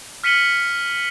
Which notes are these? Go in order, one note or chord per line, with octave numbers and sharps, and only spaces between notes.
F6 B6 C#7 D#7 F#7 G7